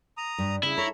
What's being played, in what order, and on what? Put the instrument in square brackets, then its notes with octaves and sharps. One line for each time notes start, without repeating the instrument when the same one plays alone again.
[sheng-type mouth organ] A#5 D#6
[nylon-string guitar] G2
[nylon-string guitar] C#3 [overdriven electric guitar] E4
[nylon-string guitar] A4 [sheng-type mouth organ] C#5 A#5 B5